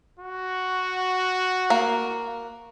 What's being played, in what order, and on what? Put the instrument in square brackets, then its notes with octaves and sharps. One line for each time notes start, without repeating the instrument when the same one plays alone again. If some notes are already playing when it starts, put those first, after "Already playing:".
[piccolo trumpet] F#4
[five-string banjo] A#3